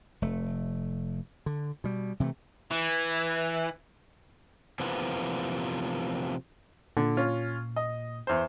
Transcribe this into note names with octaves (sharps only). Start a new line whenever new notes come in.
F1 A3
D3
B2 G3
C3 E3 G#3 A3
E3
C3 E3 F3 A#3 B3
A#2 D3
C#4 F4
D#5
E2 C5